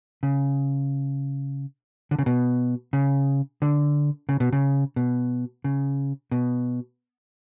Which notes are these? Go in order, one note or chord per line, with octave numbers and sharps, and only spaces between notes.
C#3
D3
C#3
B2
C#3
D3
C#3
B2
C#3
B2
C#3
B2